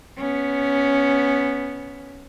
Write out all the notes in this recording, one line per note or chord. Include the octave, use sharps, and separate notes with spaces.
B3 C#4